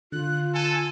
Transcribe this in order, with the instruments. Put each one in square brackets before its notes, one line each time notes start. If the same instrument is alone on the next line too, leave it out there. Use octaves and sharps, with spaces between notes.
[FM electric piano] D3 [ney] F4 [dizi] F#6
[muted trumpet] A4 [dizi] G#5